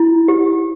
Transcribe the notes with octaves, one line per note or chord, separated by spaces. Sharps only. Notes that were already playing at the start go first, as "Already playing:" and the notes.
Already playing: E4
G4